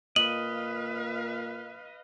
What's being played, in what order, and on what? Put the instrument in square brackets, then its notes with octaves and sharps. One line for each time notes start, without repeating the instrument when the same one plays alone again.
[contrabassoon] A#2 [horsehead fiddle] B4 F5 [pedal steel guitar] D#5 [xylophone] F#7